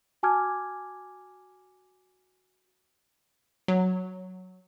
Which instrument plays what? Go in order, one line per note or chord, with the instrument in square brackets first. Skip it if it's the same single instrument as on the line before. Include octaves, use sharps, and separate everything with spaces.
[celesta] F#4 G#5 A5 D6 F6 G#6
[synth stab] F#3